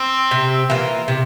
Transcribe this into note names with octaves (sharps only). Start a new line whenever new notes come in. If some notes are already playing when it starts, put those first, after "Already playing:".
Already playing: C4
C3
E3 A#3 F4
C3